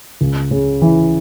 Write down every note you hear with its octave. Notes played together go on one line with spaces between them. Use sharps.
C#2
C#3
E3